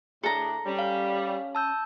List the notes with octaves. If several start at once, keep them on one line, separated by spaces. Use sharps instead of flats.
A2 D4 G#4 A4 A#5
G3 C#4
F5
A5 E6 G6